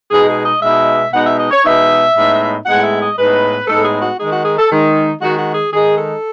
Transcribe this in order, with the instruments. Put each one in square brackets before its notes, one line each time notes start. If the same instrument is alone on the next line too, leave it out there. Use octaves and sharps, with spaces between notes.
[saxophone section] B2 G#3 B3 D#4 G#4
G#4
D#5
B2 G#3 B3 D#4 E5
B2 G#3 B3 D#4 F#5
E5
D#5
C#5
B2 G#3 B3 D#4 E5
A2 G#3 B3 D#4
A2 G#3 B3 D#4 F#5
E5
D#5
A2 G#3 B3 D#4 B4
A2 G#3 B3 D#4 A4
G#4
F#4
D#3 G#3 D#4 G#4
F#4
G#4
A4
D#3 G#3 D#4
D#3 G#3 D#4 F#4
F#4
G#4
D#3 G#3 D#4 G#4
A4